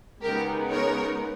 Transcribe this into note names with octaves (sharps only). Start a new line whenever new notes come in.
C#3 G#3 B3 D#4 G4 A#4
A#4 C#5